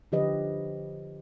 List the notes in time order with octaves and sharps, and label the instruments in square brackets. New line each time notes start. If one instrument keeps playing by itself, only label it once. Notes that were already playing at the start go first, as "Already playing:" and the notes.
[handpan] D3 F3 G4 B4 D#5